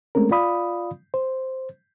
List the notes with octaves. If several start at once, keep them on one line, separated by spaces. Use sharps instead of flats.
G#3 A3 C4 C#4 A#4
F4 D5 F5 B5 D#6
C5